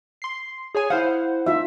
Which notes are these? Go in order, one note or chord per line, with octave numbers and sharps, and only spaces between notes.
C6 C7
G#4 C#5 G#5
E4 C5 F5 F#5
D#4 F4 E5